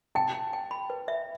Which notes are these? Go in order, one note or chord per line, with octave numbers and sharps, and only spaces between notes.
G5 A5
G5
G5
B5
B4
E5